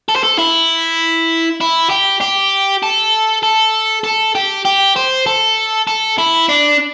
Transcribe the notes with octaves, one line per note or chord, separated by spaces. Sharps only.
A4
C5
A4
E4
E4
G4
G4
A4
A4
A4
G4
G4
C5
A4
A4
E4
D4